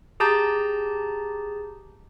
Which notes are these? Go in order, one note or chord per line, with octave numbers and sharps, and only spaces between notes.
G4 G#4 A5 A#5 G6 A6